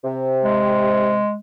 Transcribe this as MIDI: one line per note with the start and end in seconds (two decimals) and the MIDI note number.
0.04 1.19 48
0.44 1.37 56